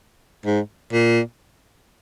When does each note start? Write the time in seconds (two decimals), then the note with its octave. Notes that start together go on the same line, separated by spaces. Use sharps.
0.46 G#2
0.92 A#2